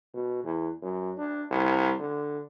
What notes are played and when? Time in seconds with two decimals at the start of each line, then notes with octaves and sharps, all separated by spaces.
0.14 B2
0.44 E2
0.82 F#2
1.18 D4
1.50 C2
1.99 D3